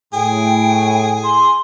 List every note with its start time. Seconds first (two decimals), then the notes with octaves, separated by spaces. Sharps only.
0.14 A2 G#4 G5
1.24 C6